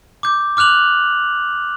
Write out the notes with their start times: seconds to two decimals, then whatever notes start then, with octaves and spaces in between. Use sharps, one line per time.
0.23 D6 G6
0.57 D6 F6 F#6 F7 F#7